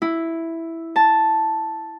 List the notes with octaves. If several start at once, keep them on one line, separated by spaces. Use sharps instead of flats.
E4
A5